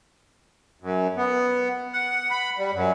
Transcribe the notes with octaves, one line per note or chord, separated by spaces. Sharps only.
F#2
B3
F#5
B5
G3
F#2